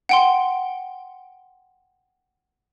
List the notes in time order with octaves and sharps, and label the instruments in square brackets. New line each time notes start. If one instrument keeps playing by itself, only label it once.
[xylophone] F#5 G5 C6